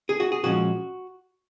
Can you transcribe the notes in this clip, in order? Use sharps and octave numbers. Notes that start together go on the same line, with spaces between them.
G#4
F#4
G#4
A#2 F3 G#3 C#4 F#4